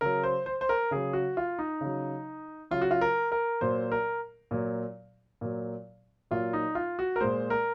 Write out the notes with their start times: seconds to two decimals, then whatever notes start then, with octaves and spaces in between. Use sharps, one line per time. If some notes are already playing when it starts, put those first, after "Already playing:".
0.01 C#3 F#3 A#4
0.23 C5
0.46 C5
0.61 C5
0.69 A#4
0.91 C#3 F#3 G#4
1.13 F#4
1.37 F4
1.59 D#4
1.81 C#3 F#3
2.71 C#3 F#3 F4
2.81 F#4
2.91 F4
3.01 A#4
3.32 A#4
3.61 A#2 F#3 C5
3.92 A#4
4.51 A#2 F#3
5.41 A#2 F#3
6.31 A#2 F#3 F4
6.53 D#4
6.75 F4
6.99 F#4
7.16 A#4
7.21 A#2 G#3 C5
7.50 A#4